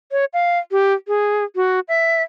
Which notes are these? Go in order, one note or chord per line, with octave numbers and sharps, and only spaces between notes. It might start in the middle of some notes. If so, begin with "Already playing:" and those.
C#5
F5
G4
G#4
F#4
E5